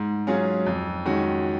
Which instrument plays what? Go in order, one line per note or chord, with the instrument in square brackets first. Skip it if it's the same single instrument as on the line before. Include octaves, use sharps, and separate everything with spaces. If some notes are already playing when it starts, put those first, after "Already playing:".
Already playing: [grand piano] G#2
F#3 C#4 F4 G#4
F2
D#3 G#3 C#4 F#4